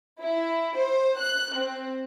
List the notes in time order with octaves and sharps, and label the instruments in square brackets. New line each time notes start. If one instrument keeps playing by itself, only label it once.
[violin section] E4
C5
F#6
C4